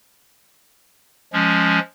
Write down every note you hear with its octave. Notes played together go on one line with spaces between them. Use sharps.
F3 G#3 C#4